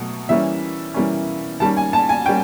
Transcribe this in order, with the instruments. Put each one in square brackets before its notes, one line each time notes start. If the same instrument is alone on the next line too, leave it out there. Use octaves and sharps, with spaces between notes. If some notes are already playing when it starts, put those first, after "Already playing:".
Already playing: [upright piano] B2 F#3 A3
E3 G3 A#3 C#4 E5
E3 G3 A#3 C#4
D#3 G3 A#3 C#4 A5
G#5
A5
G#5
G3 A#3 C#4 G5